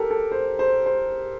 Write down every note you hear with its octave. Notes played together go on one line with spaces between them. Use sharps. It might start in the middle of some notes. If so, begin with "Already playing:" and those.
Already playing: G4 A4 A#4
A4
C5
C5
C5